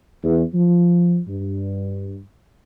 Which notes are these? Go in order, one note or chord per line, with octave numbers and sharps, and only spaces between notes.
E2
F3
G2